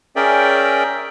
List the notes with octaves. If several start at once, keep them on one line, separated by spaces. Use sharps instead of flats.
C#4 G#4 A#4 D5 E5 G5